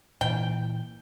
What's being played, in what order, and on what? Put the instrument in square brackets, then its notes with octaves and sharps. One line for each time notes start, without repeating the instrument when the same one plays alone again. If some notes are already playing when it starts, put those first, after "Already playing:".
[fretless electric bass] A#2 E3 [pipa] G5